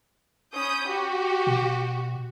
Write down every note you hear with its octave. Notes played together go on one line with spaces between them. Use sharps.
C#4 B5 D#6 G6
F#4 G4
B2